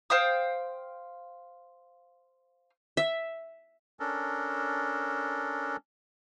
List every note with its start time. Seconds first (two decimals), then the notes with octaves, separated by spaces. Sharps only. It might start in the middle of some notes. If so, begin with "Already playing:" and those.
0.10 C5 F5 G5 D#6
2.97 E5
4.00 C#4 D4 A4 A#4